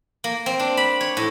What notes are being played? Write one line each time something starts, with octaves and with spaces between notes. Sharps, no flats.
A#3
C4
D4
B5
C#5
A2